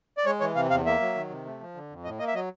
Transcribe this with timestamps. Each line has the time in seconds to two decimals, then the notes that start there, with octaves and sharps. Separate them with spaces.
0.18 D5
0.26 G#3 C#5
0.40 E3 C#5
0.55 C3 F5
0.70 E2 F5
0.86 A#3 E5
1.00 F#3
1.15 D#3
1.30 C3
1.46 A3
1.60 F3
1.75 D3
1.90 F2
2.04 A2 D#5
2.19 A#3 D#5
2.28 E5
2.34 F#3 D#5